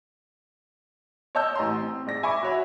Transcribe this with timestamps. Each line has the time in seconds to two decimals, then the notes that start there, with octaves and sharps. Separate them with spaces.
1.35 C#5 D#5 A5 E6 G6
1.55 A1 A#5 C6
1.80 C4
2.06 G#2 D5 A#6
2.23 E5 G#5 B5 C#6 D6
2.43 F#4 C#5 E5